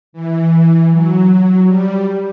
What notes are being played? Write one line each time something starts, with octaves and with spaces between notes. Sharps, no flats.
E3
F#3
G3